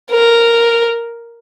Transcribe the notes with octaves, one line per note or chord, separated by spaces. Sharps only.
A#4